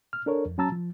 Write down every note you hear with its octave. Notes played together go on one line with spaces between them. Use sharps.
F6
D4 A4 A#4 C#5
F2
F#3 C#4 A5 A#5 E6 A6
F3